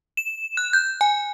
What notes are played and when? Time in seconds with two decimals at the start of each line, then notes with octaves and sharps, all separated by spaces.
0.17 E7
0.57 F#6
0.73 G6
1.01 G#5